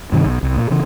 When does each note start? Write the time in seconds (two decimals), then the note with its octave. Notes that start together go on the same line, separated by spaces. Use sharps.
0.12 G2 C3 D#3
0.25 B1
0.43 C2
0.57 A#2
0.70 C#3 E3